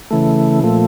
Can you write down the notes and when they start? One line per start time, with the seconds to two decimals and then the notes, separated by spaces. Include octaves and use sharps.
0.11 C#3 E3 A3
0.63 A#2 F3 A3